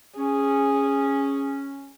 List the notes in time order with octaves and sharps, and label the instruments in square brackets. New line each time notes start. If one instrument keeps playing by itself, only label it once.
[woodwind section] C#4 [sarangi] G#4